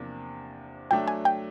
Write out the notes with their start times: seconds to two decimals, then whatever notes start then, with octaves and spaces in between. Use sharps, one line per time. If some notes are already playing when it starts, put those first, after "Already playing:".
Already playing: E2 C3 F3 A#3 D4
0.91 F#3 A3 D4 G5
1.08 G#5
1.25 G5